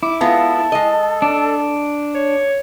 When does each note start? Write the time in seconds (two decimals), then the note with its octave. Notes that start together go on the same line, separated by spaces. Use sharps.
0.03 E4 D6
0.21 G#3 B3 F4 A4
0.72 G#3 D#5
1.22 D4
2.14 C#5